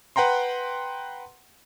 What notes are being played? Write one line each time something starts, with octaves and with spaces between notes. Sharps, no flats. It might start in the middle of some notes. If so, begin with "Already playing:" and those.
B4 F#5 G5 A#5 C6